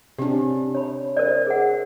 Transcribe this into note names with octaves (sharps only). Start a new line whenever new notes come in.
C3 C#4 D4 G4
C#5 B5
A#4 C5 D5
G#4 F#5